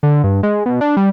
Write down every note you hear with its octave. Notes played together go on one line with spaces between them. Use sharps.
D3
G2
G#3
B2
D4
G3